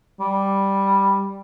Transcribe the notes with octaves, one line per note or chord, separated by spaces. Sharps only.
G3